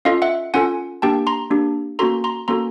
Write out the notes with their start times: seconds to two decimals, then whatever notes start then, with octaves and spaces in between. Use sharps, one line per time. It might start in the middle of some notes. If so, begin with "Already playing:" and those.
0.05 C#4 F4 A4 D#5 F5
0.22 E5 F#5
0.54 C#4 F4 A4 F#5 G#5
1.02 A#3 D4 G4 G5 A5
1.27 A#5 C6
1.51 A#3 D4 G4
1.99 A#3 C#4 F#4 A4 A#5 C6
2.24 A#5 C6
2.48 A#3 C#4 F#4 A4 A#5 C6